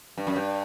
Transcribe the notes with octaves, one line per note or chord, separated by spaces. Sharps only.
G2
F#2
G2